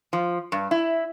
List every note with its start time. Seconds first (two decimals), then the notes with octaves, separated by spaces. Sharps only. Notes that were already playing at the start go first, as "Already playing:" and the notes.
0.13 F3
0.52 G2
0.71 E4